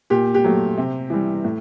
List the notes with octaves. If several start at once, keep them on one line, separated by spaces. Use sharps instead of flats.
A#2 G4
G4
F#3 A3
C3
E3 G3
A2